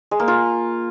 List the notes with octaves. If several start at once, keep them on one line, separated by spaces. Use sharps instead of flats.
G#3
A#3
F4